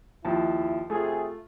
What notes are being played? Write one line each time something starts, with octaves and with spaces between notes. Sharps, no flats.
D#2 F3 E4 A5
C3 A3 F4 G#4